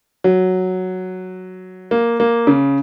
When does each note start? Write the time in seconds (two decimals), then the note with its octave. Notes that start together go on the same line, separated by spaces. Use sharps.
0.24 F#3
1.91 A#3
2.20 A#3
2.47 C#3